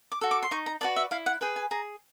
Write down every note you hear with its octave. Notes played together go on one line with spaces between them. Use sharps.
D6
F#4 A4
D6
C6
D#4 C#6
A#5
F#4 B4 D5 A5
E5
E4 F5
F#5
G#4 B4 G5
G#5
G#4 A#5